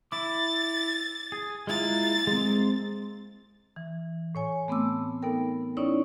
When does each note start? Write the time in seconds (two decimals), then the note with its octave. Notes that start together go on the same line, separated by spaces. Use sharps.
0.12 E4 D6 A6
1.32 G#4
1.67 G#3 A#3 E4 F4 A6
2.27 G#3 C4
3.76 E3
4.35 A2 C#5 G#5
4.68 A3 B3 C4 D6 E6
5.22 B3 D#4 A4 A#4 G5
5.77 C#4 D#4 E4 C#5 D5